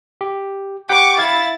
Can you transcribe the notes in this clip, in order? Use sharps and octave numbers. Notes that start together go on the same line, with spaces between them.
G4
G4 F#5 G5 C#6 D6
E4 F5 G#6 A6